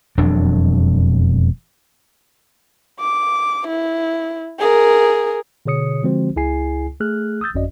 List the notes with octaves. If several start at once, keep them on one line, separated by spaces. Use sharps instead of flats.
E1 F2 F#3 D4
D6
E4
G#4 A#4
B2 D3 G#4 C#5 D#6 C#7
D3 F3 G#3 C4 F#4 C5
C#2 E4 G#4 G#5 C7
A3 G#4 F6 F#6
D#6 E6 G6 A6
G1 F2 C#4 F#4 D5 D#5